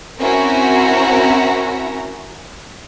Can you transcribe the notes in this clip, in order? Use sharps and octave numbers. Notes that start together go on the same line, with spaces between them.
C4 C#4 E4 F#4 A#4 A#5